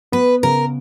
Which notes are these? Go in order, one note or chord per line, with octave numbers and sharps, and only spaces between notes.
B3 B4
C#3 A#4